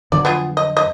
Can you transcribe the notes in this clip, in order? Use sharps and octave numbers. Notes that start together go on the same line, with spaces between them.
F2 D3 F#3 D5
B3 F4 G#4
D#5
D#5